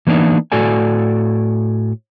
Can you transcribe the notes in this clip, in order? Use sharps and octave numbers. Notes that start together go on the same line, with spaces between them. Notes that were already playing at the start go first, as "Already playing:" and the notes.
E3 A#3 B3 D4 D#4
A2 F#4 A4 D5 G#5